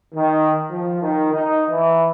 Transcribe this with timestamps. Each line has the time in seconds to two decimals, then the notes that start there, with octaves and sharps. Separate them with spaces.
0.15 D#3
0.71 F3
1.02 D#3
1.33 D#4
1.69 E3